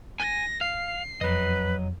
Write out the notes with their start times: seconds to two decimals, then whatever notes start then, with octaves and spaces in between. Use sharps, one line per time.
0.20 G#5 A#6
0.61 F5 C7
1.21 F2 F#3 B4 D#5